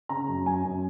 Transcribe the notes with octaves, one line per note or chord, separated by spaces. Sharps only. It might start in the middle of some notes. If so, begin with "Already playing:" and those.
C#3 A#5
F#2
F#2 G#5
F#2